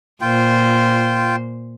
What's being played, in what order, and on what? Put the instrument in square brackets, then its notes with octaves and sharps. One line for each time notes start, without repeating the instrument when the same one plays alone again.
[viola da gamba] A#2 C5 [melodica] F4 G5